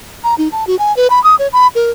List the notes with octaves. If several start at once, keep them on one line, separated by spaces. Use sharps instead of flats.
A#5
D#4
A5
F#4
G#5
B4
B5
D#6
C#5
B5
A#4